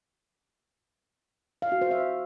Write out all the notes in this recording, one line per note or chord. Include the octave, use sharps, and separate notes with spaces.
F5
F#4
C5
E5